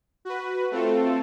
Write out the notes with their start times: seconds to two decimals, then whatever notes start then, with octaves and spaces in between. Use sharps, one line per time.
0.25 F#4 B4
0.71 A3 C4 F4 A4